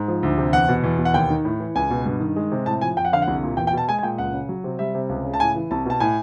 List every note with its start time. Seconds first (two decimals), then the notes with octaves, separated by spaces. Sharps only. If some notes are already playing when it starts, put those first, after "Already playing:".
Already playing: G#2
0.08 F3
0.23 D2
0.38 C3
0.53 E2 F#5
0.69 B2
0.84 E2
0.98 B2
1.05 F#5
1.14 D#2 G5
1.30 D#3
1.45 A2
1.60 E3
1.75 C#2 G#5
1.90 B2
2.06 G2
2.20 D#3
2.36 G#3
2.52 C3
2.66 A2 A5
2.81 F3 G#5
2.97 F2 G5
3.05 F#5
3.12 D3 F5
3.22 F#5
3.28 C2
3.43 A#2
3.57 E2 G5
3.67 G5
3.73 B2 A5
3.88 G#3 G#5
3.99 G#5
4.03 A#2 G5
4.18 C#2 F#5
4.33 C#3
4.49 F#3
4.64 C3
4.79 G3 E5
4.95 C3
5.09 C#2
5.24 C#3
5.34 A5
5.40 A2 G#5
5.56 E3
5.71 C2 A5
5.86 B2 A5
6.00 A2 G#5